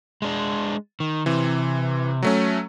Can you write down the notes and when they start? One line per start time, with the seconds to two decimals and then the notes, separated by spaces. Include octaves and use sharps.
0.22 G#3 D4
1.00 D#3
1.26 C3 E3
2.22 F#3 A3 C#4